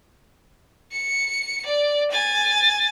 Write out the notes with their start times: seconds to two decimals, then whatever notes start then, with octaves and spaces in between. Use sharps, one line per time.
0.92 C#7
1.65 D5
2.11 G#5 A6